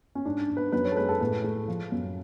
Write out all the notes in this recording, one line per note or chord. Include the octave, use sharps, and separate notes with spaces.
C#4
G#2 D4
G#2
B4
F#2 B4
C#5
A4
G#3 B4
A4
A2 B4
A3
F3
F#2